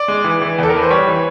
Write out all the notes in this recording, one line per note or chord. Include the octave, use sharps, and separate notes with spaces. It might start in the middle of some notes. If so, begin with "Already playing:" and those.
Already playing: D5
G#3
E3
E3
E2 A4
A#4
E3 B4
C5
G3 C#5
E3